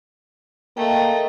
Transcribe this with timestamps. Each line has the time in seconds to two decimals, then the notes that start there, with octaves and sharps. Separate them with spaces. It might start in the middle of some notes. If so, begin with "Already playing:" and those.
0.77 A3 A#3 D#5 G5